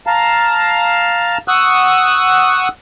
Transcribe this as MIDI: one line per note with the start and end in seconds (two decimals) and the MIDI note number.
0.07 1.38 77
0.07 1.38 81
0.07 1.38 82
1.48 2.68 78
1.48 2.68 85
1.48 2.68 87
1.48 2.68 88
1.48 2.68 90